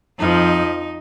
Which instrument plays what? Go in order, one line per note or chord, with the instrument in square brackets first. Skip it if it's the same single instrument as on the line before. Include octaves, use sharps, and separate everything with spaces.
[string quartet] F2 F3 D#4